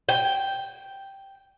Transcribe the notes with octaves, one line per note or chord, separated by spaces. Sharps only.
G5